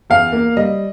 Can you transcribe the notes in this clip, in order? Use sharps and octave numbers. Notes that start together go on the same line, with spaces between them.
E2 F5
A#3
G3 D#5